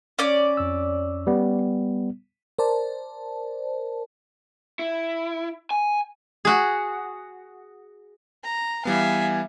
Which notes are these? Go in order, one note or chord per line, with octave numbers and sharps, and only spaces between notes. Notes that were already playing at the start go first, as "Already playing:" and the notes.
C#4 D5
F2 E6
G3 B3
A#4 C5 D5 A5
E4
G#5
F#4 G#4
A#5
E3 G3 B3 E5 F5 G#5